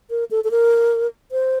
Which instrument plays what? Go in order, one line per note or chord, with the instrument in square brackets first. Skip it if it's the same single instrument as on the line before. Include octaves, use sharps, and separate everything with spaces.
[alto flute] A#4
A4
A4
A#4
C5